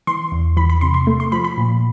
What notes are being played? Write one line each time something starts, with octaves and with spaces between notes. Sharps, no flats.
E3 C6
E2
E3 B5
B5
C3 C6
C6
A3
C6
F3 B5
B5
A#2